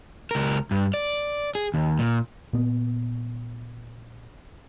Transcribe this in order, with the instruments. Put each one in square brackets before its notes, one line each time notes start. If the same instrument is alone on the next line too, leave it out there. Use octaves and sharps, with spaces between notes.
[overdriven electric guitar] C#2 A#4
G2
D5
G#4
D#2
A#2
[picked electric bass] A#2 B3